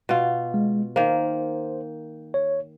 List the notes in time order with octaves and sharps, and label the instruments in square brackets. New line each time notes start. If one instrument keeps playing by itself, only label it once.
[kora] B2 F4
[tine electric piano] G#3
[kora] D#3 A#3 [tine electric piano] C5
[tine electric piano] C#5